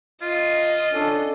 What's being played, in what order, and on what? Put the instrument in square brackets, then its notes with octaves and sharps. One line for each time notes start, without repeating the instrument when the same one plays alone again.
[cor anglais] F4 [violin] D#5
[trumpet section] C#4 D4 A4